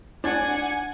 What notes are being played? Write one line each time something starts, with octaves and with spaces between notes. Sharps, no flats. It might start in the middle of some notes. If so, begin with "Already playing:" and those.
D4 D5 F#5 G#5